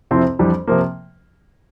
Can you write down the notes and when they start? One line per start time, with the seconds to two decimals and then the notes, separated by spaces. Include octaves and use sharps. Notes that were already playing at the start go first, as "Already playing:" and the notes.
0.11 F2 C3 F3 C4 E4
0.39 F2 E3 G3 D4
0.67 C3 F3 A#3